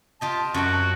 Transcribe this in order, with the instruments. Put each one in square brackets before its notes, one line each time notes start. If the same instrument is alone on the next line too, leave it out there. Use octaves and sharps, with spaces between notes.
[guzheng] F4 G4 D#5 [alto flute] A5
[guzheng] F#2 G5 [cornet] F#4